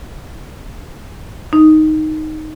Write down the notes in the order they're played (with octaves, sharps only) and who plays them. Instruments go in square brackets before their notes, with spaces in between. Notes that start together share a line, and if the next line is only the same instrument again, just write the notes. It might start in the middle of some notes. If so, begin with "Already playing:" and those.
[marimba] D#4